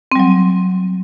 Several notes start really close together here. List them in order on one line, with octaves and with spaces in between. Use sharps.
C4 G3 F#3